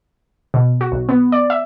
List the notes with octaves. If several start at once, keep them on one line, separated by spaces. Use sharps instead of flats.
B2
F#4
B1
B3
D5
E5